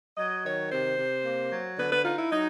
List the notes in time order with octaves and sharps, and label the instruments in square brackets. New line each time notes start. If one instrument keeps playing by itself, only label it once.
[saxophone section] F#3 D#5
D#3 C#5
C3 C5
C3
A#3
F#3
D3 B4
B4
D#4 F4
E4
F#3 D#4